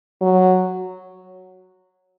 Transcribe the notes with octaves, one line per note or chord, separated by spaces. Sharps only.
F#3